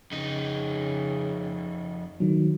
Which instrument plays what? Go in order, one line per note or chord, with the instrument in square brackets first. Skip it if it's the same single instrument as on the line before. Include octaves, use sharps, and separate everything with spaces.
[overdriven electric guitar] F2 D#4 [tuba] C#3
[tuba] D2 [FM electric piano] D#3 F#3